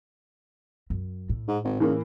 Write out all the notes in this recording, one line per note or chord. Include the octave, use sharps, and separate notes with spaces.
F#2
A2
G#2
G#1
C#3 E3 A#3